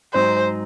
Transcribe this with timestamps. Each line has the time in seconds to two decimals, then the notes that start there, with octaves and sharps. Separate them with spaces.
0.14 G#2 F#3 C4 D#4 C5